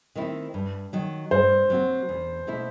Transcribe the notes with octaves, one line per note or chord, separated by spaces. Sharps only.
D#3 A3 C4 E4
G2
D#3 F#3
G2 C5
F#3 C4 F#4
E2
B2 A3 E4